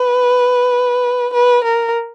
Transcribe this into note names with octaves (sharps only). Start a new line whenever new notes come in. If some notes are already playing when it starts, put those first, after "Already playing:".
Already playing: B4
B4
A#4